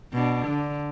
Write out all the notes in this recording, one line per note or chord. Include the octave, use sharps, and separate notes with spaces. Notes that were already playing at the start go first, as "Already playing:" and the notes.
B2 D4
D3